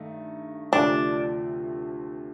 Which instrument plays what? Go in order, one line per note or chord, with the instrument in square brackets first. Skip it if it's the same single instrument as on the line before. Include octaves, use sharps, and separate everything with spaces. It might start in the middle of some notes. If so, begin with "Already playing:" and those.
Already playing: [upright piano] G2 D#3 A3 D#4
[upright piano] D2 C3 F3 A3 C4 [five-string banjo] D4